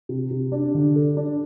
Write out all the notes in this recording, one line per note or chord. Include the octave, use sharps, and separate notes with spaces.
C3
C3
D4
D3
A4
D4